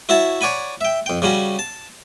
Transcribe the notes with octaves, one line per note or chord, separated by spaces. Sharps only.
E4 F#4 C#5 E5 A5
C#5 D5 F#5 G#5 B5
E5 G5
F2 G5
C#3 G3 C#4 F#4
A5